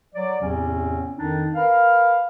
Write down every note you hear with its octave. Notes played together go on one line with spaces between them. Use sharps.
F#3 D5
E2 A2 C3 C4 C#4
F2 D#3 D4 D#4
A#4 B4 F5